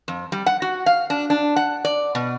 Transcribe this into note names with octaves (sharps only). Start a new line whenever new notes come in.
F2
G3
F#5
F#4
F5
D4
D4
F#5
D5
B2